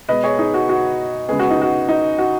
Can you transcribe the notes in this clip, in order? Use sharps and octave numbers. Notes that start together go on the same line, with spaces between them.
B2 G#3 B3 B4 D#5
G#4 C#5
D#4 G#4
F#4
F#4
C#3 G#3 B3 G#4
F#4
D#4
F#4
D#4
F#4